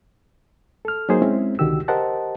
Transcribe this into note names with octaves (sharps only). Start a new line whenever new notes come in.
A4 F6
F#3 A#3 D#4 G#4 C5
G#3 C4 C#4 E4
C2 D3 D#3 F#4 G4 E6
G4 A#4 C5 D#5 F#5 A5